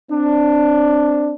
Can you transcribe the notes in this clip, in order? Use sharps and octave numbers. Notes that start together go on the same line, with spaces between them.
C4 D4